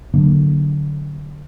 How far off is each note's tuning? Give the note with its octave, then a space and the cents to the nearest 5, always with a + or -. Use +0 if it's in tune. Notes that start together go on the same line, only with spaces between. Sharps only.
D3 +0 F#3 +0 A#3 -5